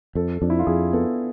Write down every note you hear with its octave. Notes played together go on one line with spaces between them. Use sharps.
F2 A4
F2 D4
E4
F4
F2 G#4
B3 A4